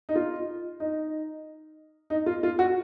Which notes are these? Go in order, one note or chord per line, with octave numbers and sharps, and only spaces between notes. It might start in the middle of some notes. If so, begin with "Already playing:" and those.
D#4
F4
D#4
D#4
F4
F4
F#4